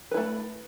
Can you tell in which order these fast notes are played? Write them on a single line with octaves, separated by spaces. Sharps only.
B4 E4 A3